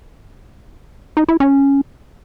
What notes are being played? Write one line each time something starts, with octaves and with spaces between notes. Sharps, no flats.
D#4
E4
C#4